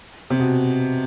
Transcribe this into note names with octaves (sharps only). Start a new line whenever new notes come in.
C3
B2